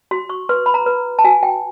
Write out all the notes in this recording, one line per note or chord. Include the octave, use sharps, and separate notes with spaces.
F#4 C6
C#6
B4 C6
B5
A#5
B4
A5
F#4 G#5
G5